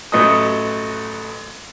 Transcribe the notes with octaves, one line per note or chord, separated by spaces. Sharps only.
A1 F#3 A3 B4 D#5 D#6